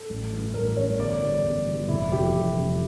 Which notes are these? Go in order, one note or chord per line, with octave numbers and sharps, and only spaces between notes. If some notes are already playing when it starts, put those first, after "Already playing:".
Already playing: A4
A1
G2 E3
A1 A#4
G2 E3 C#5
G1 D5
G2 E3 G3
G1
G2 E3 G3
F1 E4
F2 E3 G3 G4
F1
F2 E3 G3